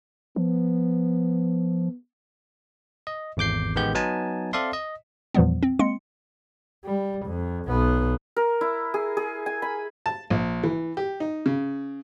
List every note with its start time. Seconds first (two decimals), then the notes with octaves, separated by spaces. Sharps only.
0.36 F3 B3
3.07 D#5
3.37 G#1 E2 D6 G6 C7
3.75 A1 D#3 G#3 B3 G4 G6
3.95 F#3 B3 D#4 G#5 A5
4.53 C4 A4 D5 E5 F5 C6
4.73 D#5
5.35 E2 A#2 E3 F3 G3 B3
5.63 C4
5.79 G#3 A#3 C4 C6 C#7
6.86 G3
7.27 F2
7.66 B1 B3
8.36 A#4
8.61 E4
8.94 G#4
9.17 G#4
9.46 G#5
9.62 B5
10.06 A5
10.30 A#1
10.63 E3
10.97 G4
11.20 D#4
11.46 C#3